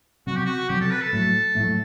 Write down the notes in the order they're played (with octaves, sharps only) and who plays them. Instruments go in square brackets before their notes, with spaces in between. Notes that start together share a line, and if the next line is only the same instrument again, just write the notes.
[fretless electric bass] C3 F#3 C4 [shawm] F#4
[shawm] G4
F#4
[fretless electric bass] C3 F#3 C4 [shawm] G4
[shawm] A4
B4
A4
[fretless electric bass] A2 F#3 A3
A2 F#3 A3